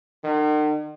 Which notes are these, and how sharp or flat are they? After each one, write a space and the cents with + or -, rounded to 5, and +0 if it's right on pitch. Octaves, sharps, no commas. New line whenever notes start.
D#3 -45